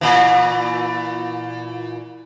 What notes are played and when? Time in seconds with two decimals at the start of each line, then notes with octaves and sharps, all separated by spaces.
0.01 A#2 E3